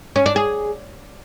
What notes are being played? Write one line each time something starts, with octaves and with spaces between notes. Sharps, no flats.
C#4
D4
G#4